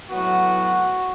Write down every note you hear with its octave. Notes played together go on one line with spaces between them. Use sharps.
A2 F#3 B3 F#4